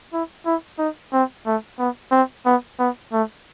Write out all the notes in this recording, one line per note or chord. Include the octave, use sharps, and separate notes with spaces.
E4
E4
D#4
C4
A3
B3
C4
B3
B3
A3